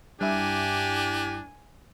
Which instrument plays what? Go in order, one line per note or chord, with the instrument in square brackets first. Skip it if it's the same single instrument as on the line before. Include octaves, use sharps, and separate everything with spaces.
[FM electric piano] G2 E4 [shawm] D4 [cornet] G4 [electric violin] G#5